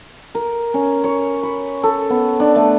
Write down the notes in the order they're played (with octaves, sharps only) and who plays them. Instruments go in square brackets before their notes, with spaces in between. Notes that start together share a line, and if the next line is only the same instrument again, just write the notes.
[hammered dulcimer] A#4
C#4
C#5
B5
A4
B3
D4
A3